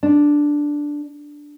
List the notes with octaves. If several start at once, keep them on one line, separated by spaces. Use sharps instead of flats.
D4